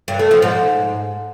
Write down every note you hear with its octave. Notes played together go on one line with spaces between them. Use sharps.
G2
A3
F3
G#2